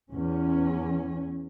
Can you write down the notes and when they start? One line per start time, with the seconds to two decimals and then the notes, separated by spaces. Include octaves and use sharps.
0.11 E2 C#4